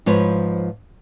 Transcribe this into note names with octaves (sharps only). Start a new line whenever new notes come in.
G#2 F3 B4 C#5